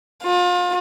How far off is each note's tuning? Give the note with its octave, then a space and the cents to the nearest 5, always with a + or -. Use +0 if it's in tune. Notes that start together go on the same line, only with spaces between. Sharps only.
F4 +35